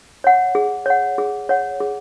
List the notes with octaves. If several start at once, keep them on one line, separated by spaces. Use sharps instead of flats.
C#5 F#5
G#4
C#5 F#5
G#4
C#5 F#5
G#4